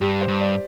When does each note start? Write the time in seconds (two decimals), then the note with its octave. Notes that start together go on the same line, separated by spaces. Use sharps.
0.01 G2 G4
0.21 C5
0.28 G2
0.41 D5